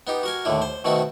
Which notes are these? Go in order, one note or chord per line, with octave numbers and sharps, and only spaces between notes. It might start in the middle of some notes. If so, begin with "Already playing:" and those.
B3 D#4 G4
F#4 A#4 G#5
D#2 A2 D3 E4
C5
B2 D#3 A3 C4 F#4